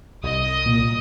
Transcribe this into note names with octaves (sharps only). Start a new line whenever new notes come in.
C2 D#5 D#6
A#2